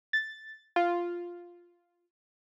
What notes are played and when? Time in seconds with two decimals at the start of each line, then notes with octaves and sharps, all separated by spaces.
0.13 A6
0.76 F4